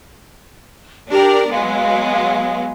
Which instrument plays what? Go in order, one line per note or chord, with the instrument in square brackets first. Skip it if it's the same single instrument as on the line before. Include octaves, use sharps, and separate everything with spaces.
[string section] D4 A#4 D5 [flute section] G4
[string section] F#3 G#3 B3 [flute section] F5